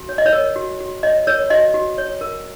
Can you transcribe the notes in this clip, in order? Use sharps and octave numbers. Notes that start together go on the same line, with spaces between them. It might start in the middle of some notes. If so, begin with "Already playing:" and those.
Already playing: F#4
C#5
D#5
C#5
A#4
F#4
F#4
C#5 D#5
A#4 C#5
F#4 D#5
F#4
C#5
A#4